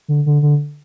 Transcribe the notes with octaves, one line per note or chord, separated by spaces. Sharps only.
D3
D3
D3